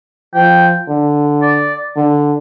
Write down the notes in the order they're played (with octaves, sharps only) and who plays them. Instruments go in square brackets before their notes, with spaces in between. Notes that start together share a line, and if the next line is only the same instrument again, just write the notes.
[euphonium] F3 [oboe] G5
[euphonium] D3
[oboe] D5
[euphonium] D3